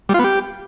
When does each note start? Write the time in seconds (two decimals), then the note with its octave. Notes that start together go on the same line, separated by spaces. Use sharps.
0.09 G3
0.14 F4
0.19 B3
0.24 G4